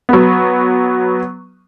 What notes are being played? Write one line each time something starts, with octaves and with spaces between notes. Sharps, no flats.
F#3 B3